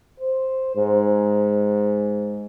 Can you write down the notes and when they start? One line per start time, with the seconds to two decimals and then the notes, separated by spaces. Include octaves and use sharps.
0.20 C5
0.76 G#2